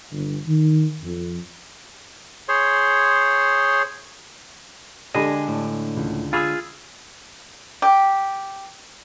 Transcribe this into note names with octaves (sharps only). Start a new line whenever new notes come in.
G1
D#3
F2
G#4 C5 C#5 C6
D3 G#3 D4 G4 G#4 D#5 G#5 B5
A2
C#2
F4 G#4 B5 D#6 E6
G4